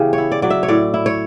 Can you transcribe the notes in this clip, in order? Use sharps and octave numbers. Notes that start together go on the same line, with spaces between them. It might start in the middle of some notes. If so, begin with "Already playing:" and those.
Already playing: C#3 E3 B3 G4
C#5
E4
D5
F#3 D5
E5
C#5
A2 D5
E4
C#5